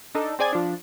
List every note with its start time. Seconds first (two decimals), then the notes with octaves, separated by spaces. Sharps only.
0.15 D4 D#4 A4
0.39 C4 G#4 D5 G#5 G#6
0.53 F3 D4